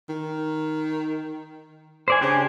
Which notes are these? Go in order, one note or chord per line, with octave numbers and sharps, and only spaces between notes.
D#3
C5 D5 G#5
C#3 D4 G4 G#5